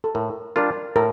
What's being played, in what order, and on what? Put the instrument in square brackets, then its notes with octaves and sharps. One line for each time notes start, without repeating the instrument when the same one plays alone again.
[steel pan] A4
[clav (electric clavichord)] A2 [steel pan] A#4
[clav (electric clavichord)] G3 D4 F4 [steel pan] A#4
[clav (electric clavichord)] A2 [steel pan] A#4